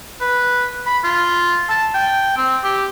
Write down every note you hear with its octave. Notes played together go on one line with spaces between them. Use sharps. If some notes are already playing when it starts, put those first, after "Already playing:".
B4
B5
F4
A5
G5
C4
G4